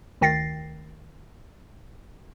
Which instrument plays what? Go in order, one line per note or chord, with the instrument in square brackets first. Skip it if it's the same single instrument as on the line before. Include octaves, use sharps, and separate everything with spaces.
[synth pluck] D2 D#3 G5 A6 A#6 C7